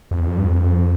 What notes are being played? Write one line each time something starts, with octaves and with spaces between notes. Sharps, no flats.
F2
E2
F2
G2
F2